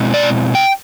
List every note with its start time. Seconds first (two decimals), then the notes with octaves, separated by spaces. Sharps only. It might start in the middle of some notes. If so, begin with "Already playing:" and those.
Already playing: B2 G#3 C4 E4
0.14 D5
0.55 G5